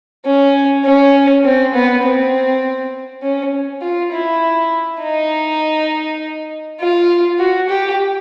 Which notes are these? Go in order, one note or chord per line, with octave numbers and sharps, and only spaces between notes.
C#4
C#4
C4
B3
C4
C#4
F4
E4
D#4
F4
F#4
G4